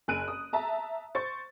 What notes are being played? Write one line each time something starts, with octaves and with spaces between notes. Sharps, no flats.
F#1 G#5 F#6 D7 D#7
D#6
E5 A5 A#5
C5 C#6 A6